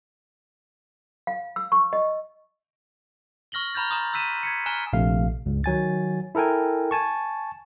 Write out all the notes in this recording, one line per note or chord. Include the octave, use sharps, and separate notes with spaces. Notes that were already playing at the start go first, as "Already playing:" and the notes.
F5
E6
C#6
D#5
C#6 F6 A#6 F#7 G7
A#5 B5 F6 G6 A6
A#5 C6 D#6 A6
E6 F#6 B6 D#7 E7
G#6 B6 C#7
G#5 A#5 F6 F#6 G7
A#1 C3 A3 F5
C#2 G2
D#3 F#3 G#5 A6
E4 A4 A#4 G5 G#5
G#5 A5 C#6